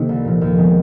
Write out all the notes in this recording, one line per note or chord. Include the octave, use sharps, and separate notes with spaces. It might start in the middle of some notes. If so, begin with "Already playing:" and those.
Already playing: C3 D#3 A#3 D#4
C2
A#2 F3
D#2
D#3 G#3 B3